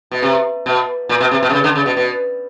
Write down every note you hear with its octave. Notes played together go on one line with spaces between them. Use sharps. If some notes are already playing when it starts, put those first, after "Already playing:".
B2
C3
B2
A#2
B2
C3
B2
C3
C#3
D3
C#3
B2
B2